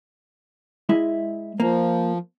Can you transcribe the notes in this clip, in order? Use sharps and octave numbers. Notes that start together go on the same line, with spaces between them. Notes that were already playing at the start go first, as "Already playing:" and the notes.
G#3 E4 E5
F3 A#3